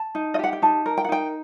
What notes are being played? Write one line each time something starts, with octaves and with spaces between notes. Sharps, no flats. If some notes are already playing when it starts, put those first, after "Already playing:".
Already playing: A5
D#4
D#5
G4 F#5
G5
D#4 A5
A#4
G5
F#5
D#4 G5